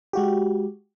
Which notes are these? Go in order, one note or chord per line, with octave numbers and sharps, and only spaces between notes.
G#3 F#4 G4